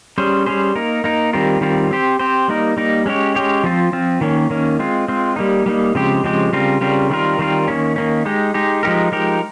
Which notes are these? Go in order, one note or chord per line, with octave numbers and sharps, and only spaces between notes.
G3 C#4 G#4 C5
G3 C#4 G#4 C5
A#3 D#4 A#4
A#3 D#4 A#4
D#3 G3 C4 F4 A#4
D#3 G3 C4 F4 A#4
C4 G4 C5
C4 G4 C5
G3 A#3 D#4 A#4
G3 A#3 D#4 A#4
G#3 C#4 G4 C#5
G#3 C#4 G4 C#5
F3 C4 F4
F3 C4 F4
D#3 A#3 C#4
D#3 A#3 C#4
G#3 C4 F4
G#3 C4 F4
G3 A#3 D#4
G3 A#3 D#4
C#3 F3 G#3 C4 G4
C#3 F3 G#3 C4 G4
C#3 G3 C4 F4 A#4
C#3 G3 C4 F4 A#4
D#3 G3 C4 F4 A#4
D#3 G3 C4 F4 A#4
D#3 A#3 C#4
D#3 A#3 C#4
G#3 D#4 G4
G#3 D#4 G4
F3 G#3 D#4 G4 A#4
F3 G#3 D#4 G4 A#4